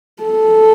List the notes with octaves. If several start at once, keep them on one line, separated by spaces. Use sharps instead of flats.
A4